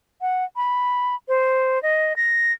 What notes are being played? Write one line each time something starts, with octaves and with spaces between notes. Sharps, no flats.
F#5
B5
C5
D#5
A#6